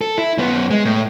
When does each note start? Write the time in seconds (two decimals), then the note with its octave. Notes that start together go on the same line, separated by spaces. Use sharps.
0.01 A4
0.18 E4
0.38 F#2 B3
0.71 G#3
0.85 A2